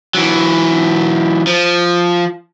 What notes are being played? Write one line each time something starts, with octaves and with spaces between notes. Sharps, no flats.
E3 F#3
F3